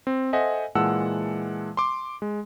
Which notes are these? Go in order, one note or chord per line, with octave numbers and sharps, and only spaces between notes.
C4
A4 C5 D#5 E5 F#5 G#5
A#2 E3 G#3 F#5 A5 E6
C6 D6
G#3